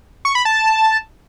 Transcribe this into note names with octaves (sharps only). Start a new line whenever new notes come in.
C#6
B5
A5